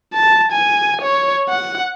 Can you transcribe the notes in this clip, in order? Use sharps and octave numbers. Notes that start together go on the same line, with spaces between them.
A5
G#5
C#5
F#5